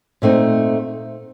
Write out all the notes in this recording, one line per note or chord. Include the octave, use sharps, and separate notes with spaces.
A#2 A3 C4 D#4